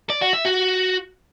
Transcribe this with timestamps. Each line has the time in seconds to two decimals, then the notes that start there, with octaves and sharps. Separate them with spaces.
0.10 D5
0.21 F#4
0.33 E5
0.45 F#4